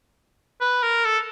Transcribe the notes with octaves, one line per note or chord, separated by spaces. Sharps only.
B4
A#4
A4